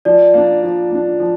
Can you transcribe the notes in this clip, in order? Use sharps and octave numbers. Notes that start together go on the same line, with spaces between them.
F3 D5
A#3 D4
F3
A#3 D4
F3